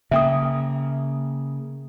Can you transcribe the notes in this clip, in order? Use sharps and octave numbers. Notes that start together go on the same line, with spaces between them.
C#3 A#3 E5 G5 D#6